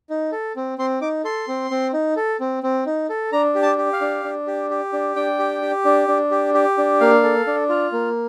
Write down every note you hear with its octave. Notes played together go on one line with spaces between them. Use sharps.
D#4
A4
C4
C4 C6
D#4 D6
A4 C6
C4
C4
D#4
A4
C4
C4
D#4
A4
D4 A#5
G4
A5
G4
F5
D4
D4
G4
G4
D4
D4 G5
G4
G4
D4
D4
G4
G4
D4
A#3 F5
A4
D4
F4
A#3